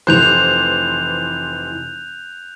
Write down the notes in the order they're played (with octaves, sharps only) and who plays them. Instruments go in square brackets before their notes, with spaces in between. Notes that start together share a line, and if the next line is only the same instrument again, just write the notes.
[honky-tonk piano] F1 E3 C5 [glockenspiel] F#6 G6 F7